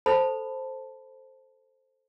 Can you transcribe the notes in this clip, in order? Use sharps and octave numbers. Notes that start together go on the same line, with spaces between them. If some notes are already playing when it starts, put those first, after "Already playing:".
A4 C5 A5 B5